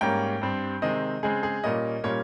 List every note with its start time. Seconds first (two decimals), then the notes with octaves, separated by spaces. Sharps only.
0.01 G#2 G3 A#3 C#4 G5
0.42 G2 G3 C4
0.82 C3 D#3 G#3 C4 D#5
1.23 C#3 G#3 C4 G#4
1.43 G#4
1.63 A#2 G3 A#3 C#4 D#5
2.04 A#2 G3 A#3 C#4 C#5